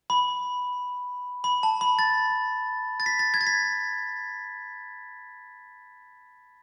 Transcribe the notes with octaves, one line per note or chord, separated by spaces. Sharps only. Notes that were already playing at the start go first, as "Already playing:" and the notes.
B5
B5
A5
B5
A6
A6
B6
A6
G#6
A6
B6